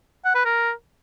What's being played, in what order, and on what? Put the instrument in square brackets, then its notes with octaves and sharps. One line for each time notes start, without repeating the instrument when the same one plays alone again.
[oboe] F#5
B4
A#4